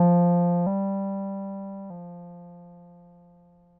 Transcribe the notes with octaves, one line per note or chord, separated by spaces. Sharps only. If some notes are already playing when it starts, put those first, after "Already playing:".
Already playing: F3
G3
F3